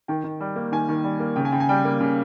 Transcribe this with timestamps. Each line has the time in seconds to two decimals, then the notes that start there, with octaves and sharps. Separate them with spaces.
0.08 D#3 G5
0.24 D#3
0.40 G3
0.56 A#3
0.72 D#3 G#5
0.89 D#3
1.04 G3
1.20 A#3
1.36 C#3 G5
1.45 G#5
1.52 C#3 G5
1.60 G#5
1.69 G3 G5
1.85 A#3
2.00 C#3